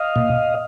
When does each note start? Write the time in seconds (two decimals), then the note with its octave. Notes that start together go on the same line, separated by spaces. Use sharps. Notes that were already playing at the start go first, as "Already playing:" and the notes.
Already playing: D#5 F5
0.16 A#2